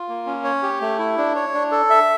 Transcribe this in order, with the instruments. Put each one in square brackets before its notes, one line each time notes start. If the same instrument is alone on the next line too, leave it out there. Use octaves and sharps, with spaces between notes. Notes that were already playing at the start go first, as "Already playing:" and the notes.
Already playing: [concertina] F4
A#3
C#4
C#5
G4
A3
E4
D4
C#5
D4
A4
E5